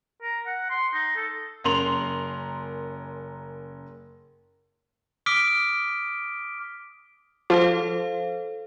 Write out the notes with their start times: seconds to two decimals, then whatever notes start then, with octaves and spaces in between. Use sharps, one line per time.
0.22 A#4
0.46 F#5
0.70 C6
0.93 D#4
1.16 A4
1.64 F#1 C#4 A#4 C6 F7 F#7
5.26 D6 D#6 F6 B6 D7 G7
7.50 F3 A4 C5 F5